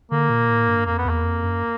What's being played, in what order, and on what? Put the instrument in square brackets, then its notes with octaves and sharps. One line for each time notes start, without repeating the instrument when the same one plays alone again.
[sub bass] D3 [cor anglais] A#3
[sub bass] A#2
A2
G2
[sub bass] F2 [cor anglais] A#3
[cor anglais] B3
[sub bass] E2 [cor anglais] A#3
[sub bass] F2
F#2